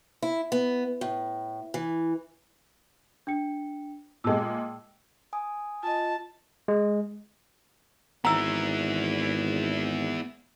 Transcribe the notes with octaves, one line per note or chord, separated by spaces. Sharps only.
E4
B3
A2
E3
D4 G5 C#7
A#2 G#3 G5 A5 E6
G#5 D#6
F4 D#5 A5
G#3
G#1 B3 E4 A#5 E6